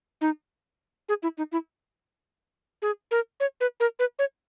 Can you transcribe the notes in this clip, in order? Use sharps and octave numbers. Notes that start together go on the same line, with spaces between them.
D#4
G#4
E4
D#4
E4
G#4
A#4
C#5
B4
A#4
B4
C#5